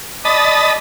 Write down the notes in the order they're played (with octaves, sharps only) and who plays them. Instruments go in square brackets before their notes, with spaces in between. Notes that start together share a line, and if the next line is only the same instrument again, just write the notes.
[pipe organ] D5 D#6 A6 [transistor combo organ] D#5 A5 B5